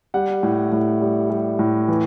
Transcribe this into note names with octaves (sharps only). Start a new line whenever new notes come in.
G3 F#5
A2
A2
G3
G3
A2
E3